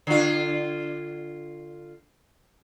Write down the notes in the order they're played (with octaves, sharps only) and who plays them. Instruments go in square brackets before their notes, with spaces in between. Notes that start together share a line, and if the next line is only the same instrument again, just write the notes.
[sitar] D3 F4